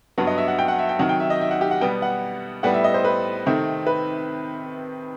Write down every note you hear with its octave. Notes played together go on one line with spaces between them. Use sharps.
G2 F#3 B3 F#5
D#5
E5
F#5
G5
F#5
E5
G5
C3 D#3 F#3 F#5
G5
E5
D#5
E5
F#5
G4
F#5
B2 G3 B3 G5
F#5
A2 G3 B3 F#5
E5
D#5
C5
B4
C3 D#3 A3 C4
B4